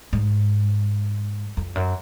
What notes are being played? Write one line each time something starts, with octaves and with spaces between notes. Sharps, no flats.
G#2
F2
F#2